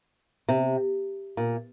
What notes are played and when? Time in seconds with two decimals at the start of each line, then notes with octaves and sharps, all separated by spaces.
0.49 C3
1.37 A#2